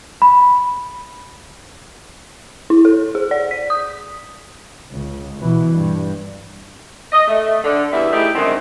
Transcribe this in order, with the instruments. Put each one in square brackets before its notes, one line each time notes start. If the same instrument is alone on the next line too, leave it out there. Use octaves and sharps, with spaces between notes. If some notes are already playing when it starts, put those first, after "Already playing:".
[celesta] B5
[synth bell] E4
A4
G#4
D5
B6
D#6
[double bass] C#2
B2 E3
G2
[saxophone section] D#5
A3
D3
E2 G2 E4 E5
A3 D#4 E4 G4 G#4
F#2 D3 D#3 G#3 A3 C4